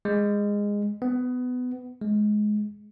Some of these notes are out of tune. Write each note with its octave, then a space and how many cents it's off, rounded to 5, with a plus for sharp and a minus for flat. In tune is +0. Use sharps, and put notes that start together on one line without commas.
G#3 -15
B3 +20
G#3 +20